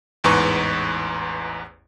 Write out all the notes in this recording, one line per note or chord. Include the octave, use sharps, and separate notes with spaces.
A1 E2 G#2 B4 C#6